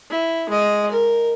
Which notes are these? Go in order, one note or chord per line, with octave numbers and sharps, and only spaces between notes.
E4
G#3 D#5
A#4